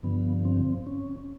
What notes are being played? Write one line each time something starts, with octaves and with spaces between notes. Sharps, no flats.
G2 D3 F3 B3
C4
C#4